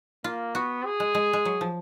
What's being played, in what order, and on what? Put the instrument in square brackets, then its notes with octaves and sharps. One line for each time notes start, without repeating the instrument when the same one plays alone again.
[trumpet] A#3 [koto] F4
[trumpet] B3 [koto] F#4
[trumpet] G#4
[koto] G#3
G#3
G#3
F#3
F3